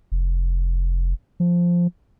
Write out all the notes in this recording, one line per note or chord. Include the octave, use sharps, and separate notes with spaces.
F1
F3